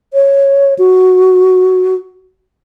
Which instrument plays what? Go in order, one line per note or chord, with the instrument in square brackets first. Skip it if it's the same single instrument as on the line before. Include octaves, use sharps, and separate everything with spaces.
[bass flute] C#5
F#4